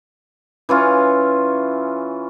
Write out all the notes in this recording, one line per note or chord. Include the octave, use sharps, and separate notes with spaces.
E3 C#4 F4